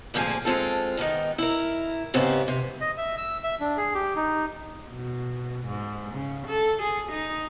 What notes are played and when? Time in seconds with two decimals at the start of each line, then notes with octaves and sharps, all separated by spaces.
0.14 D2 A#2 F3 C4 G#4 G#5
0.45 G#3 C4 F4 A4
0.97 E2 D#3 B3 D#4
1.38 E4 A#4
2.14 G#2 C#3 B3 C4 G4
2.48 C3
2.81 D#5
2.97 E5
3.18 E6
3.44 E5
3.60 D4
3.77 G#4
3.94 G4
4.16 D#4
4.90 B2
5.67 G#2
6.15 C#3
6.47 A4
6.82 G#4
7.11 D#4